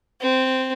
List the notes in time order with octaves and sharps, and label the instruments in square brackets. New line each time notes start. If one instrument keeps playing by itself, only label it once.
[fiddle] C4